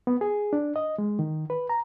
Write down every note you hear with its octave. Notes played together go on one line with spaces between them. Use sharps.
B3
G#4
D4
D#5
G#3
D#3
B4
A#5